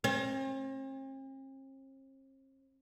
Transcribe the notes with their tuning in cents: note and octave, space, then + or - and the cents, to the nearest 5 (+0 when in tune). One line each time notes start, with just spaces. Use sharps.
C4 +45